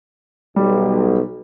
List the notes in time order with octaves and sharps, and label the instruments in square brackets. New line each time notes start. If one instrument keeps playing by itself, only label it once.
[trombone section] B1 [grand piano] G3